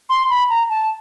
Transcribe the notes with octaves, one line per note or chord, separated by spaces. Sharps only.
C6
B5
A#5
A5